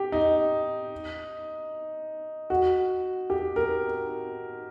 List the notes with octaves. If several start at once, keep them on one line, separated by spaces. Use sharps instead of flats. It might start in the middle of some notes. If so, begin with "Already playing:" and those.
Already playing: G4
D#4
F#4
G4
A#4